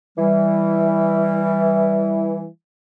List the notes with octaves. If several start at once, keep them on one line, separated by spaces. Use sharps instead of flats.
E3 G3